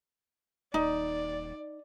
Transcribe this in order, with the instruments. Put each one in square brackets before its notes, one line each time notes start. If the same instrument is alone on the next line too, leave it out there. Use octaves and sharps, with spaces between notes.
[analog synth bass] D#1 [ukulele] D#4 [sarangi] D5